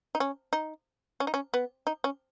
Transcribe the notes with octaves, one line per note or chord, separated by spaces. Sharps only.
D#4
C#4
D#4
C#4
D#4
C#4
B3
D#4
C#4